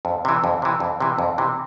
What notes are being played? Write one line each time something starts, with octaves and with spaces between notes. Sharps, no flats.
F2
C3 E3
F2
C3 E3
F2
C3 E3
F2
C3 E3